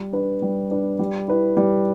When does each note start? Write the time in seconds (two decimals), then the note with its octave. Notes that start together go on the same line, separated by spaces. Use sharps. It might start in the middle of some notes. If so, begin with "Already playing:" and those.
Already playing: G3
0.13 D4 B4
0.42 G3
0.71 D4 B4
0.99 G3
1.28 E4 B4
1.57 G3